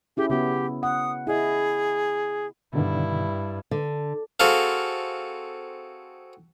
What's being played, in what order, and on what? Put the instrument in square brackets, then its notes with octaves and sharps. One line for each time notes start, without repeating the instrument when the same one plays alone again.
[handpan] C#4 E4 G#4 [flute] G4
[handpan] C#3 B3 F#4 [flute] G4
[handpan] F#5 [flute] D#6
[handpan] E4 D#5 [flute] G#4
[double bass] G2 [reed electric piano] B2 D3 D#3 [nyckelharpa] E4
[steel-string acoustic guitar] D3
[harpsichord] C4 F#4 G#4 A4 F5